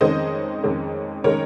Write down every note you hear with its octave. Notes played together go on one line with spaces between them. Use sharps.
F2 D#3 G#3 C#4 C5 D#5
F2 D#3 G#3 C#4
D#3 G#3 C#4 A#4 C#5